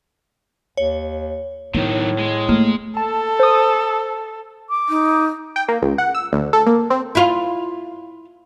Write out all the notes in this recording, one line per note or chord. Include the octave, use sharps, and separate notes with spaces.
D#2 C#5
A2 D#3 F#3 B3
G#3
A3 A#3
A4 A5
C5 D#6
D6
D#4
G5
A#3
C#2
F#5
E6
D2
A4
A#3
C4
E4 F4